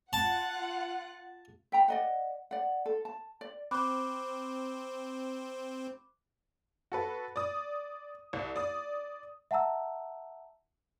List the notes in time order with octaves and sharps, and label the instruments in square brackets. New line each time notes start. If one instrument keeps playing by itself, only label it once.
[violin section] F4 F#5 [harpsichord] A5
[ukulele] E5 G5 A#5
D5 D#5 F#5
D5 F#5
A4
A5
D5
[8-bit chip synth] C4 C5 [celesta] B5 D6 F#6
[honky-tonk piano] F#4 A4 B4
D5 D#6
C2
D5 D#6
[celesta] E5 F#5 A5 A#5 E6